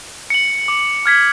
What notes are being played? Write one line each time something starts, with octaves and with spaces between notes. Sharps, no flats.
C#7 F#7
D6
F6 G#6 B6